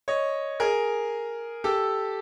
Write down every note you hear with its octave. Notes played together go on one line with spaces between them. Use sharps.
C#5 D#5
G#4 A#4
G4 A4